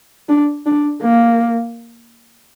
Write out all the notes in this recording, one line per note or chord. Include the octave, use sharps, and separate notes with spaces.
D4
D4
A#3